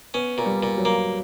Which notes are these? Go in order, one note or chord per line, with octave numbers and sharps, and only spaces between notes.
B3 C#4
A#2
G3
A#2
F#3
A#3